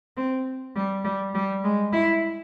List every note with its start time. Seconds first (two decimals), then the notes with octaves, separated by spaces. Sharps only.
0.17 C4
0.76 G3
1.04 G3
1.34 G3
1.64 G#3
1.93 E4